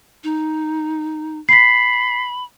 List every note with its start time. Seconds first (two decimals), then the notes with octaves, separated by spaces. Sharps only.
0.24 D#4
1.49 B5 B6 C7